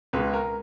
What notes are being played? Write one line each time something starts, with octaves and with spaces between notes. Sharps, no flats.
C#2 B2 G#3 B4
A#4